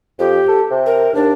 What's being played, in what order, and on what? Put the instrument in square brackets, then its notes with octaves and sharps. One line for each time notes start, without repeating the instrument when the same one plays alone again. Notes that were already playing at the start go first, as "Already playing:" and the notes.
[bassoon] F2 [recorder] G4
[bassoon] A4
C3
[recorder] A#4
[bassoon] D#2 [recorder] D4